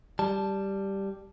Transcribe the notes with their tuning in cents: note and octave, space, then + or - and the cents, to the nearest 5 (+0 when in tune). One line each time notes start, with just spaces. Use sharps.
G3 +0 A5 +0